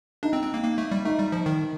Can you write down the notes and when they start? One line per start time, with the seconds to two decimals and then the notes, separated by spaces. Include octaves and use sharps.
0.23 D4 D#4
0.33 C4
0.43 C4
0.54 A#3
0.64 A#3
0.78 A3
0.91 G3
1.05 A3 D#4
1.19 G3
1.32 F3
1.46 D#3